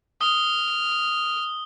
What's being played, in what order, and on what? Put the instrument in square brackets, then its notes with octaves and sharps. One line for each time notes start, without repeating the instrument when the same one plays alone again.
[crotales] D#6 G7 [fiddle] F6